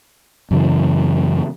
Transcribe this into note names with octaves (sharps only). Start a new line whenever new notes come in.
F#2 C#3 E3